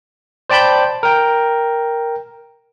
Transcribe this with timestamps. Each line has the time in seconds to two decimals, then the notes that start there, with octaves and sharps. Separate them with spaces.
0.50 C5 D5 G5 A5 B5 G6
1.03 A#4 G5